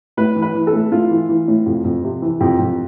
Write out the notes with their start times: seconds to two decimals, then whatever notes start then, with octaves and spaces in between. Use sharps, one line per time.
0.17 A2 B4
0.36 E3
0.42 B4
0.55 E3
0.67 A4
0.73 A2
0.92 A2 F4
1.11 E3
1.29 E3
1.48 A2
1.66 F2
1.84 F2
2.04 C3
2.22 E3
2.41 F2 G4
2.59 F2